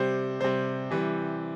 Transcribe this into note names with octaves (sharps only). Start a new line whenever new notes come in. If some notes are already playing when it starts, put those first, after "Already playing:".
Already playing: C3 G3 C5
C3 G3 C5
C3 E3 G3